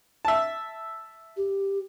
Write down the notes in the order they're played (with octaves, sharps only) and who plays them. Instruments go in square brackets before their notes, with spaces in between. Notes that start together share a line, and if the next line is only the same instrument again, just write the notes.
[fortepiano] E5 A5
[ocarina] G4